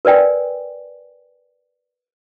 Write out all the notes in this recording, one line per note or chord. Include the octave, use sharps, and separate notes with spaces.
A#4 B4 D5 G5 G#5